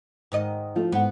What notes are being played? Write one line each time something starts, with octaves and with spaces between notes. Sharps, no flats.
G#2 D#3 D#5
F3 A3 F4
G#2 B3 F#5